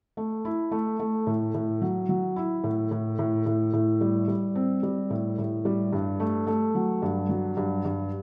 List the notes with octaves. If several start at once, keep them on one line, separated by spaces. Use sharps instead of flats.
A3
E4
A3
A3
A2
A2
F#3
F#3
E4
A2
A2
A2
A2
A2
G3
G3
C4
G3
A2
A2
G3
G2
A3
A3
F#3
G2
F#3
G2
G2